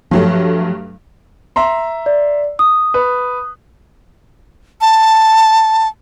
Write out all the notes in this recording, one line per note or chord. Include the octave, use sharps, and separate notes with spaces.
G2 F3 F#3 A3
E5 A#5 C6
D5
D#6
B4
A5